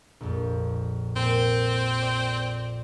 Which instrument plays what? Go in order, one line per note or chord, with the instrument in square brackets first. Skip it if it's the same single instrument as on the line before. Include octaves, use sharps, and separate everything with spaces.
[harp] A#1 F2
[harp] A#2 [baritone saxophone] C4
[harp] D5